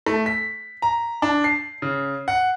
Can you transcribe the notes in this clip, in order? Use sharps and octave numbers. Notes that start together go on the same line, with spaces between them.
A3
B6
A#5
D4
C7
C#3
F#5